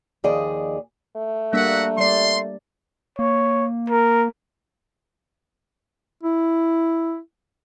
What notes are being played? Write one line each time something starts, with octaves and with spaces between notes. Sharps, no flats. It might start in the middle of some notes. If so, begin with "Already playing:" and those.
D#2 D#3 F3 G#4 D5 D#5
A3
G3 A#3 D4 F#4 E5 F#5
G3 D5 C6
A#3 C#5
A#4
E4